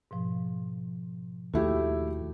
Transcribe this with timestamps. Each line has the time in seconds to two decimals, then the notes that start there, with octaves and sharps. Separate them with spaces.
0.11 G#2 B2 F3
1.54 D#2 A3 E4 F#4 G4